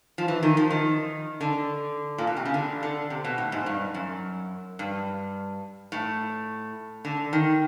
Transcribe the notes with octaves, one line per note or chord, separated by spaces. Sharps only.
F3
E3
D#3
F3
D#3
D3
A#2
B2
C3
C#3
D3
D3
C3
B2
A2
G#2
G2
F#2
G2
A2
D3
D#3